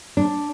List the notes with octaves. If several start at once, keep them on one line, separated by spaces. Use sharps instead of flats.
D4